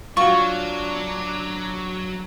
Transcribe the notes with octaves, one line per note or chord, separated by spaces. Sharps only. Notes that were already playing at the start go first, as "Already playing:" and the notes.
F#3 D4 F4 F#4 C#6